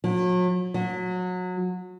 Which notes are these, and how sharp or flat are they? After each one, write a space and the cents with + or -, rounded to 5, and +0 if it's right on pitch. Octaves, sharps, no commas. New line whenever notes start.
F#3 -40
F#3 -25